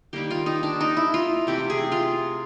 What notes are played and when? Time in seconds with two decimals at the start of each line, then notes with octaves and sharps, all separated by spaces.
0.13 D#3 G3 A#3 G4
0.30 F4
0.46 D#4
0.63 D4
0.80 D#4
0.97 E4
1.14 F4
1.47 C3 E3 A3 C4 G4
1.70 G#4
1.92 F4